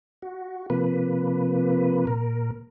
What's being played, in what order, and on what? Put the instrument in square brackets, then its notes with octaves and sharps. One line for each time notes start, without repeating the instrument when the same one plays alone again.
[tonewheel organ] F#4
C3 F3 A#3 B4
A#2 A#4